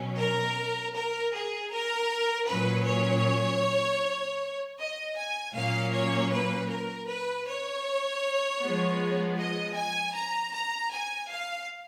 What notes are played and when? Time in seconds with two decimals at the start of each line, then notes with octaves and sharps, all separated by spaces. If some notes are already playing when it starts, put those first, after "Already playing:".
Already playing: B2 F#3 C#4
0.19 A#4
0.95 A#4
1.34 G#4
1.71 A#4
2.48 A#2 F#3 C#4 B4
2.86 C#5
4.79 D#5
5.17 G#5
5.55 A#2 F#3 A#3 C#4 F5
5.93 C#5
6.32 B4
6.70 A#4
7.09 B4
7.47 C#5
8.62 F3 G#3 B3
9.38 D#5
9.77 G#5
10.15 A#5
10.53 A#5
10.92 G#5
11.30 F5